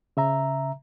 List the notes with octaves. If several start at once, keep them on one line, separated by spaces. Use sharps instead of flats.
C#3 E5 A#5